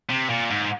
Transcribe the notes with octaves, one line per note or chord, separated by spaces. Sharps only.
C3
A#2
G#2